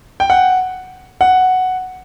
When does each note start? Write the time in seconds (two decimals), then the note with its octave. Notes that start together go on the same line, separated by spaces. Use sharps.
0.20 G5
0.30 F#5
1.21 F#5